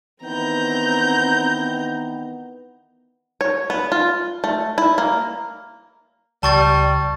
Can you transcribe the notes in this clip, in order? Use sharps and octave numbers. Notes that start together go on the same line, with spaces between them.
D#3 E3 B3 C4 A#5 G6
C#5
B3
F4
A3
E4
A#3
C#2 G3 A5 C#6 A6